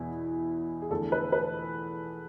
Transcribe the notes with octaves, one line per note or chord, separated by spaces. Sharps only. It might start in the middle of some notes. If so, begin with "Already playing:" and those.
Already playing: E2 B2 B3 E4
G#4
E2 D3 F3 A3 A4
B4
B4